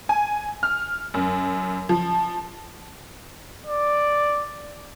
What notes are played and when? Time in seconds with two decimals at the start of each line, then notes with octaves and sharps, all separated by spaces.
0.09 G#5
0.63 F6
1.14 F#2
1.89 F3
3.66 D5